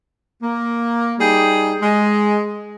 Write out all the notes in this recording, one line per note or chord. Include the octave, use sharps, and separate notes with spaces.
A#3
G3 D#4 G#4 G5
G#3